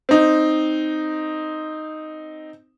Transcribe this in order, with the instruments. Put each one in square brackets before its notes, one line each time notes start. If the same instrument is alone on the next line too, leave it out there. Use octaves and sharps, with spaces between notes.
[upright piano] C4 D#4